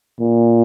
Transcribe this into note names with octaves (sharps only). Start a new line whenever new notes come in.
A#2